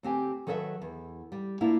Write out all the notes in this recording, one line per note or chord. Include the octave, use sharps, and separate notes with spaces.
D2 C4 G4 G#5
D#3 F#3 A4 B4 D#5 E5
E2
G3
A#3 D4 E4 F4